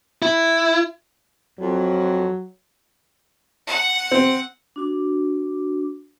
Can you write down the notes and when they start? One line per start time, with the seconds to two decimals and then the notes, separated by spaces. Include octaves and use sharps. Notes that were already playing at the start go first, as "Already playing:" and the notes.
0.22 E4
1.59 F2 F#3
3.67 F#5
4.11 C4
4.76 D4 F#4 D6